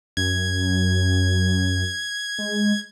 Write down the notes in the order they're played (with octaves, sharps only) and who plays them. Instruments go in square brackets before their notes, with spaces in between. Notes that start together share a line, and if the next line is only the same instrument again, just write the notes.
[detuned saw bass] F#2 [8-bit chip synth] G#6
[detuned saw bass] G#3